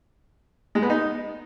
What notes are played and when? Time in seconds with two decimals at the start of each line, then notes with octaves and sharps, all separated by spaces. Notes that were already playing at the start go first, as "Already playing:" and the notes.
0.75 G#3
0.82 B3
0.90 D#4